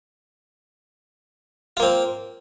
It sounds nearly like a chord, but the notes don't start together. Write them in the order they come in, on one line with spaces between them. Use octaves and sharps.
F4 A#3 C4